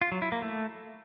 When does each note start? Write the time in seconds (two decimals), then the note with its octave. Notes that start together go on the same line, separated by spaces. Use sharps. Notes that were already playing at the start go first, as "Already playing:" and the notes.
0.01 F4
0.12 F#3
0.22 E4
0.32 A#3
0.42 A3